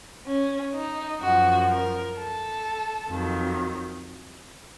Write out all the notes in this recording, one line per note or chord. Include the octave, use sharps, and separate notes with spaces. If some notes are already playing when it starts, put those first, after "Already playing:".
C#4
D#4
F#2 F3 F#4
A#4
A4
F2 D#3 F#3